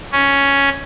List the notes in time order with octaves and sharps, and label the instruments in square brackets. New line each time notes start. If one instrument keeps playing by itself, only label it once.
[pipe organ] C#4